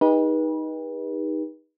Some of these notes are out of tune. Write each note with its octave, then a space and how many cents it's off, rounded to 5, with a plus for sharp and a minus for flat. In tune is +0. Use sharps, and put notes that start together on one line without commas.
D#4 +5 G4 +40 B4 -35